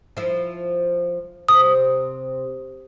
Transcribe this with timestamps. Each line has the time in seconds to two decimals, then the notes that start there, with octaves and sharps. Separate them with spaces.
0.17 F3 E4
1.48 C3 D#6